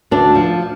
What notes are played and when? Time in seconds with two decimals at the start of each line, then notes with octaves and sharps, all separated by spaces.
0.11 D2 D4
0.35 F3